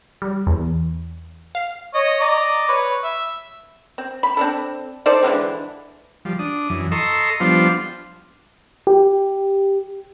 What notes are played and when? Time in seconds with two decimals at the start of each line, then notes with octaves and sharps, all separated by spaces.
0.22 G3
0.47 E2
1.55 F5
1.95 C#5 D#5
2.21 D5 D#5 A#5
2.68 B4 C#5
3.04 E5
3.98 C4
4.23 B5
4.37 C4 D4 A4
5.06 D#4 A4 C5 D5
5.23 D3 E3 G#3 C4
6.25 F3 G3
6.39 D4 D#6
6.69 F#2 E3
6.92 A4 D#5 A#5 C6 C#6 E6
7.40 F3 G3 B3 D4 F4 C5
8.87 G4